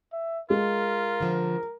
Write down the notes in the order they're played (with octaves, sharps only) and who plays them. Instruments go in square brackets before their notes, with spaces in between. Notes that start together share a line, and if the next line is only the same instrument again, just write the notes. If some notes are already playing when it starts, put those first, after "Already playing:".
[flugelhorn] E5
[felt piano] G#3 [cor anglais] F4 [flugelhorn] A#4
[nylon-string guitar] D3 F3